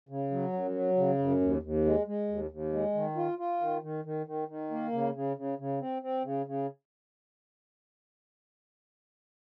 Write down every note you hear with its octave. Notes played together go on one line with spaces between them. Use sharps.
C#3
F#3
F#2
F#3
C#3
F#2
D#2
D#2
G#3
G#3
D#2
D#2
G#3
D#3
F4
F4
D#3
D#3
D#3
D#3
D#3
A#3
C#3
C#3
C#3
C#3
C4
C4
C#3
C#3